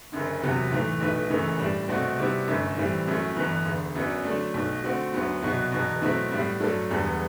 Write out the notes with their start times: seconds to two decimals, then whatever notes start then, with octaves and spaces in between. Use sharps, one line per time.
0.12 F#1 F#2 D3
0.41 E2 C3 F#3 B3
0.70 B1 A2 E3 A3
1.00 B1 B2 A3 E4 B4
1.29 F#1 F#2 E3 A3
1.59 A2 G3 D4
1.88 C2 B2 A3 C4 F#4
2.18 C3 G3 B3 E4
2.48 G1 F#2 D3 A3
2.77 A2 E3 G3 C4
3.07 F#2 F#3 A3 E4
3.36 G1 G2 E3 B3
3.65 E1 D2 D3
3.95 F#2 F#3 B3 D4
4.25 D3 F#3 A3 D4
4.54 B1 B2 A3
4.84 D3 A3 C4 F#4
5.14 D2 D3 F#3 B3
5.43 C2 B2 F#3 B3
5.72 E1 E2 B2
6.02 B2 F#3 A3 C4 E4
6.32 A2 G3 B3 E4
6.60 G2 F#3 A3 D4 A4
6.90 E1 E2 D3 G3 B3